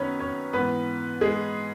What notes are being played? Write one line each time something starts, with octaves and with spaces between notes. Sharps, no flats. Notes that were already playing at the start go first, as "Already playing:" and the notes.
Already playing: F#2 D#3 B3 C#4 B4 C#5
C#4 C#5
G#2 E3 B3 B4
G#3 G#4